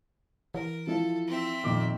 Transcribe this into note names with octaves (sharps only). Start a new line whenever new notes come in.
E3 A#4
F3 E4 A4 F5
C4 E5
F2 A#2 D#3 D6